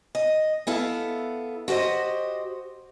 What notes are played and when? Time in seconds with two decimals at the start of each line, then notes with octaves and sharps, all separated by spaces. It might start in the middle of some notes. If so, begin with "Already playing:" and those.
0.15 D#5
0.67 B3 E4 A4 F5
1.68 F#4 G4 A#4 C5 D#5